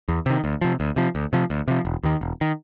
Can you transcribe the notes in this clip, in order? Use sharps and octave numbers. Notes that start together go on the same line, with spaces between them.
E2
C3 D#3
D2
C3 F3
D2
C3 F3
D2
C3 F3
D2
C3 F3
E1
D#2 D#3
E1
D#3